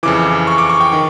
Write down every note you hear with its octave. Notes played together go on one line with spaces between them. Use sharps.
F2 C#3 E3 D6
C#6
D6
C#6
G5
D#3 G5